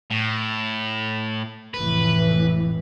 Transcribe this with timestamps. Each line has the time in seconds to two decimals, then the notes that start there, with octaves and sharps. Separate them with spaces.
0.11 A2
1.74 F1 A2 E3 B4